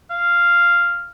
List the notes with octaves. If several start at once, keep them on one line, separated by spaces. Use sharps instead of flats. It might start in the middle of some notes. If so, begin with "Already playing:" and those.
F5